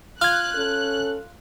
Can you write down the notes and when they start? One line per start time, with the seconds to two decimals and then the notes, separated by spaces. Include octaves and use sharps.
0.21 F4 F5 F6 F#6 G#6
0.54 C#4 A4